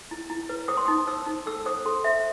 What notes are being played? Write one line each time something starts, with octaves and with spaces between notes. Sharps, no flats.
E4
E4
B4
C5 D#6
C6
D#6
D#4
C5 E6
D#4
A4 E6
C5 D#6
A4 C6
C5 E5